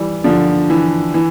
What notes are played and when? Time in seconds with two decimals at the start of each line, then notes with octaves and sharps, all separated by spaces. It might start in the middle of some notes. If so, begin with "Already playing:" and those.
Already playing: E3 G3
0.24 D3 F3
0.70 E3
1.14 E3